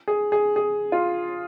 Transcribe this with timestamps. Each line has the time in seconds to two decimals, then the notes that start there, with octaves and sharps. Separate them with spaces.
0.08 G#4
0.32 G#4
0.56 G#4
0.92 F4